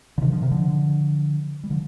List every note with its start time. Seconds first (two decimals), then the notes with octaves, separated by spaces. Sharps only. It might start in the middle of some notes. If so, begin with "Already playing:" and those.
0.18 D3
0.21 C3 D#3
0.32 D3 F3
0.42 C3 D#3
0.51 D3 F3
1.64 G3
1.70 D3 F3